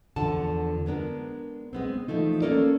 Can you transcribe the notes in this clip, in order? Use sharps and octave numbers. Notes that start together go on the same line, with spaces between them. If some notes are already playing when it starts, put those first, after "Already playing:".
E2 D3 F3 F#5 A5
G#3 B3 D4 A#4
G#3 B3 C4
E3 F3 A3 D#4
A#3 C#4 A4 A#4 D5